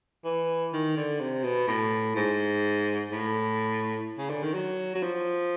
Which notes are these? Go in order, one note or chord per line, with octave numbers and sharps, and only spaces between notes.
E3
D#3
D3
C3
B2
A2
G#2
A2
C#3
D3
D#3
F#3
F#3
F3